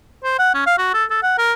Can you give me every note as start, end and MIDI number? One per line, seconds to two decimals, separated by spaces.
0.24 0.38 72
0.39 0.54 78
0.54 0.64 61
0.66 0.75 77
0.78 0.91 66
0.94 1.04 69
1.11 1.20 69
1.23 1.35 78
1.38 1.53 70